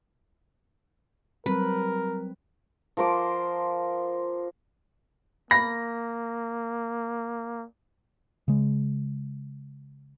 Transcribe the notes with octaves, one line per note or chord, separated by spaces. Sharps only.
F#3 G3 C4 A#4 B4
F3 A#4 C5 D6
A#3 B5 A#6
C#3 G#3